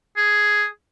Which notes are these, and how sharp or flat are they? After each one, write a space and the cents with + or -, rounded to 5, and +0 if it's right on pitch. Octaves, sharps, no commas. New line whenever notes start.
G#4 +5